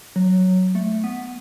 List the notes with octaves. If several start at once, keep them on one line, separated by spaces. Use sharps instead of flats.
F#3
A3
B3